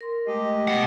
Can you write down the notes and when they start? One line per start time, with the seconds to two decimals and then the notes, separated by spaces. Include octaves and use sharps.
0.01 A#4 C6
0.27 G#3 A3 G4 D#5
0.68 B2 F#5